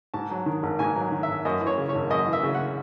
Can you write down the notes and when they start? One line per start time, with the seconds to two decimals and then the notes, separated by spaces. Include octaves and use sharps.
0.14 G#2 A5
0.31 F#3
0.46 D#3
0.63 G#1
0.79 G#2 G#5
0.96 F#3
1.12 D#3
1.23 E5
1.28 G#1
1.45 F#2 D#5
1.61 E3
1.67 C#5
1.78 C#3
1.89 C#5
1.95 G#1
2.10 F#2 D#5
2.27 E3
2.33 E5
2.43 C#3
2.55 F#5